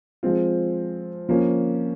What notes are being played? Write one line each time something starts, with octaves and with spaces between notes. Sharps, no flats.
F3 G#3 C4 F4
F3 A#3 C#4